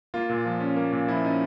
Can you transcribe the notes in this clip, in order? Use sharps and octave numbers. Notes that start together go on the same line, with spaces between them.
A#3 F4
A#2
F3
C#4
A#3
A#2
F3 E4
C#4 D#4